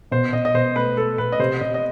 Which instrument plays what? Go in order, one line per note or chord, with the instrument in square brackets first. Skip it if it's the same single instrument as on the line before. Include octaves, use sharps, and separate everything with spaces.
[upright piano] B2 [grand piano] C5
[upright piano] B2 [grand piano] D#5
[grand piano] D#5
[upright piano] B2 [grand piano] C5
[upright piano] A3 [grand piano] B4
[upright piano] A3 [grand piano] A4
[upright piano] B2 [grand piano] B4
[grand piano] D#5
[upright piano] C3 [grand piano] C5
[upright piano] C3 [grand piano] D#5
[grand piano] D#5